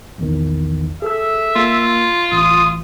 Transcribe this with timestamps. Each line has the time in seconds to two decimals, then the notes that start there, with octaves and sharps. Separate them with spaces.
0.18 A#1 E2 D#3
1.02 G#4 A4 E5 E6
1.56 A#3 F4
2.32 A1 D#6